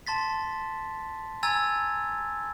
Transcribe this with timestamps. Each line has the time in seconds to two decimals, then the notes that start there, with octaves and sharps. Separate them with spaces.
0.07 A5 C6 A6 B6
1.43 G#5 A#5 E6 G#6 A6